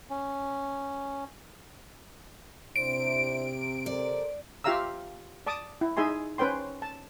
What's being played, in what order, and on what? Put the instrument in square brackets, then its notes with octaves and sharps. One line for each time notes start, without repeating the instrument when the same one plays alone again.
[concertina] C#4
[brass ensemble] C3 [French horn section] D4 E4 C5 [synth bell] D7
[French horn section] A4 A#4 C5 [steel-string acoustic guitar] D5
[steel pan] F4 G4 E5 F5 A#5 E6
D5 A5 D6 D#6
E4
D#4 G#4 E5 G#5 C6
C#4 B4 C5 G5 C6
A5